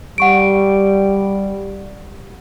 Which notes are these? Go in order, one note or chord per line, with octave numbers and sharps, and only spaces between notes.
G3 F#5 C#6 D7